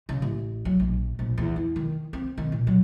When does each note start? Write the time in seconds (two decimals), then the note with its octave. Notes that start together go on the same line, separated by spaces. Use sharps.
0.09 C#3
0.22 A1
0.65 F#3
0.80 A#1
1.19 A#1
1.38 E2
1.56 E4
1.76 D#3
2.13 C4
2.37 D#3
2.52 A#2
2.67 F#3